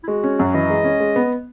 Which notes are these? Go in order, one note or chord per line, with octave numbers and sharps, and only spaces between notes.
E4
G#3 F#4
C#4
F#2
E3 D#5
G#3
C#4
G#3
B3